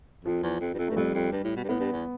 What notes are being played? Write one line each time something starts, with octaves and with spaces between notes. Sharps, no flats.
F2 F3
E2
F2
G2
F2
G2 A3
F2 G3
F2
G2
A2
B2
G2
A2 B3
G2
E2